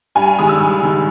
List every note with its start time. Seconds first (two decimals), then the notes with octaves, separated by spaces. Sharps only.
0.15 G2 G#5
0.27 G#5
0.38 D#3 G#3 D#6
0.49 E6
0.60 G2 E6
0.83 D#3 G#3